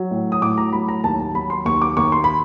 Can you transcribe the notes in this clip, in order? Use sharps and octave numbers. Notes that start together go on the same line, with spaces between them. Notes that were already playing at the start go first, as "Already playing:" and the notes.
Already playing: F#3
A2
D#6
A2 D6
A#5
F#3 B5
A#5
D#2 A5
A5
F#3 B5
C6
D#2 C#6
D6
D#2 C#6
C6
B5